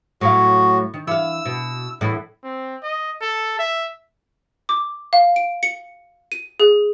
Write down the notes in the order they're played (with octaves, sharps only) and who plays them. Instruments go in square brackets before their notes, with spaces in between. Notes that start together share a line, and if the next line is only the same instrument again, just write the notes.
[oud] A2 F#3 F5 [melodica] F#4
[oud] D#3
[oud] E3 F5 [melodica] E6
[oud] B2
E2 A2 E3
[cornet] C4
D#5
A4
E5
[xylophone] D6
F5
D7
C#7
D#7
G#4